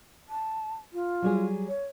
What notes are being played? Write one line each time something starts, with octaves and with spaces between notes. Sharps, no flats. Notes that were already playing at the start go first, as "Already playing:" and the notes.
A5
F4
F#3 G3 G#4
C#5